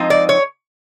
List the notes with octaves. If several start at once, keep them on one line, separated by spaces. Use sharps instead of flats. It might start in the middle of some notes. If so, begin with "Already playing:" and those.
Already playing: F3 G#3 C4 D#4
D5
C#5